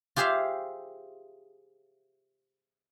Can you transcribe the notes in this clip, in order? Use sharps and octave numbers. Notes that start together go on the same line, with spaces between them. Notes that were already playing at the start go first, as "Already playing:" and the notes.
F4 G4 G#4 C5 E5 F5